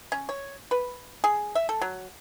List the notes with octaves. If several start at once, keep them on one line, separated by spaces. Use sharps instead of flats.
C#4
C#5
B4
G#4
E5
A4
F#3